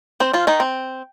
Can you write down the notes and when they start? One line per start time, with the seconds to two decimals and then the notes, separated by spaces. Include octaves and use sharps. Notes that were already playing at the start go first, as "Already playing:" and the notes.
0.20 C4 C5
0.33 F3 F4
0.47 D#3 D#4
0.60 C4